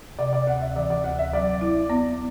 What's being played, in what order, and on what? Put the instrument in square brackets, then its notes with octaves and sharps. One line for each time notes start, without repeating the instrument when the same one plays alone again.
[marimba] C3 [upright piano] D5
[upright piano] D5
[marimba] D2 [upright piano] F#5
[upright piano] E5
[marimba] E3 [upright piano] D5
[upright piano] D5
[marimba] D2 [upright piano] F#5
[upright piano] E5
[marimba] F#3 [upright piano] D5
[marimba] E4
B3